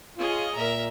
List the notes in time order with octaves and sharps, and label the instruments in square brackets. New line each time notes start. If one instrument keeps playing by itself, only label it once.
[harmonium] F4 [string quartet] G#4 C#5 D#5
[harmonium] A#2 [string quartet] A#4 E5 A#5